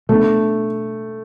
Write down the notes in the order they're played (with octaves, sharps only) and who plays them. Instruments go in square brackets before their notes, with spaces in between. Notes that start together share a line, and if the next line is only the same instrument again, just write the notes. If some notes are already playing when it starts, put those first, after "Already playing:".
[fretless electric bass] B2 B3 D4 [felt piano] A3